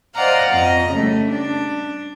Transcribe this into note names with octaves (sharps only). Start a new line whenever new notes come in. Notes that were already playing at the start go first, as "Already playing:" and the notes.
C5 D5 D#5 F5 F#5 A#5
F2 D#5 A#5
C#3 G3 A3
D4